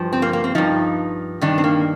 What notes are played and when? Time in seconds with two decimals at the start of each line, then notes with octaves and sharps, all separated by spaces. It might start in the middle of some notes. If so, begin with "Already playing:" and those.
Already playing: G2 F3
0.13 C4
0.22 A#3
0.33 A#3
0.44 C4
0.55 G2 F3 D#4
1.41 G2 D#3 D4
1.58 C4
1.64 A#3